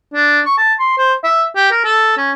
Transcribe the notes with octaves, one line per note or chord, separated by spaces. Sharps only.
D4
C#6
A5
C6
C5
E5
G4
A#4
A4
C#4